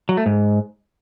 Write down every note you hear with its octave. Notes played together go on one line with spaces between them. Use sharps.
F#3
A3
G#2